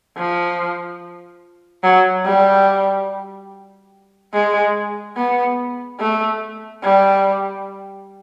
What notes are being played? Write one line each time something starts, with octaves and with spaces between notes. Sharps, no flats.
F3
F#3
G3
G#3
B3
A3
G3